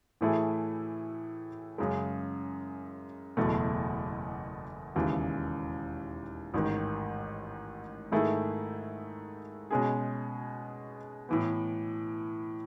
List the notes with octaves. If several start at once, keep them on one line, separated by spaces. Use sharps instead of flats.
A2 E3 A3 E4 G#4
F#2 C#3 G#3
F#1 E2 B2 A3
E1 D#2 C#3 E3
A1 G#2 D#3
G#2 D#3 A3 E4 G#4
B2 G#3 C#4 G#4
A2 E3 B3